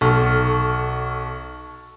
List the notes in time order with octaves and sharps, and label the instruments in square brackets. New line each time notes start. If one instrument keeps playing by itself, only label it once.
[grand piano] B1 [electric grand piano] A4 C#6 F6